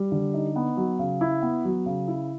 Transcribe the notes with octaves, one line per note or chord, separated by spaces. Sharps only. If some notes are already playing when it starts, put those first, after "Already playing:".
Already playing: G3
D3
D#4
B3
F#3
C#3
E4
B3
F#3
C#3
E4